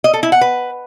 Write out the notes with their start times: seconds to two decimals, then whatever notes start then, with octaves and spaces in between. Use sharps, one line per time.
0.04 D#5
0.14 A4
0.23 E4
0.32 F#5
0.41 B4